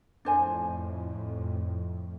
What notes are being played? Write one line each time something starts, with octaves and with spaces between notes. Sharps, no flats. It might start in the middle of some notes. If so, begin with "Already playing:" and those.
F2 A2 D4 C5 G#5